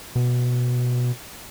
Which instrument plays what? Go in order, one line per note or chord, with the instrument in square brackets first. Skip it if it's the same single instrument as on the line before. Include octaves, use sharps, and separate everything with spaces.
[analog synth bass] B2